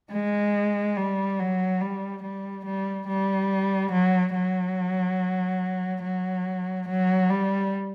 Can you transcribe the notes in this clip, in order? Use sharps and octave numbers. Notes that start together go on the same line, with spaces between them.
G#3
G3
F#3
G3
G3
G3
G3
F#3
F#3
F#3
F#3
G3